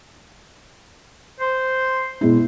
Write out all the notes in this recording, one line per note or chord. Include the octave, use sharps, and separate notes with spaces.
C5
B2 G#3 E4